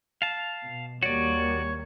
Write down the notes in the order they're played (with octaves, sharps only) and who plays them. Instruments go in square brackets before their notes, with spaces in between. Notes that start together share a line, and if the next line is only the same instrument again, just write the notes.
[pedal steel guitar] F5 A5
[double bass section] B2
[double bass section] D#2 G3 A#3 [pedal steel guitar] F#4 D5 [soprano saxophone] C#5